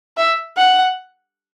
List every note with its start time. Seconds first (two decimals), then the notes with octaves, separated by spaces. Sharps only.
0.17 E5
0.57 F#5